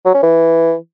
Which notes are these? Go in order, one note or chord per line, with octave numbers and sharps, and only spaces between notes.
F#3
C#4
E3